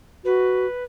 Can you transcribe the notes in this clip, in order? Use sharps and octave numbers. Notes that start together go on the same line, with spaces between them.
F#4 B4